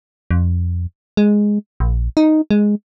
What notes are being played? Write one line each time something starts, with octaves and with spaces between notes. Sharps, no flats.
F2
G#3
A#1
D#4
G#3